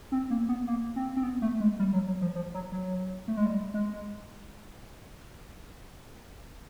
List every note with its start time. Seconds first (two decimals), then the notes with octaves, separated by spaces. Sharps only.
0.12 C4
0.30 A#3
0.48 B3
0.67 A#3
0.96 C4
1.16 C4
1.23 B3
1.42 A3
1.60 G#3
1.79 G3
1.93 F#3
2.07 F#3
2.21 F3
2.35 F3
2.54 F#3
2.72 F#3
3.28 A3
3.37 G#3
3.46 G3
3.74 G#3